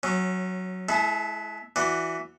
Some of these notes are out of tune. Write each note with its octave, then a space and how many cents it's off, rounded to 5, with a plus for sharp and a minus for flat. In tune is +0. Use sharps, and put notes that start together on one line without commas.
F#3 +0 C#4 -20
G#3 +35 E4 +0 A4 -15
E3 +0 F#4 +0 D5 -5